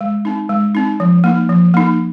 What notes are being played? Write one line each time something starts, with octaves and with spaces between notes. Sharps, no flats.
G#3
C4 D#4
G#3
C4 D#4
F3
A#3 D#4
F3
A#3 D#4